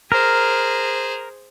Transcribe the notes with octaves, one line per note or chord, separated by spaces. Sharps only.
G#4 A#4 C5